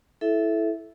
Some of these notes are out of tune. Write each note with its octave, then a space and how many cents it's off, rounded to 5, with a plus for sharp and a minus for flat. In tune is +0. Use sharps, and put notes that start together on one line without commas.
E4 +0 A4 -15 E5 +0